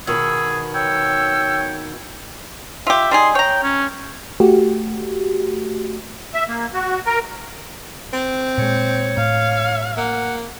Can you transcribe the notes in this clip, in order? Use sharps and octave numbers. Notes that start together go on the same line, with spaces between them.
B2 D#3 B3 G#4 E6
C#5 G5 E6
F4 G4 E5
G3 D#4 G#4 C6
C#5 G5 A#5
C#4
A3 F#4 G4
E5
A#3
F#4
A#4
C4
A#2 G#3 C#5
A2 F5
A#3 F#5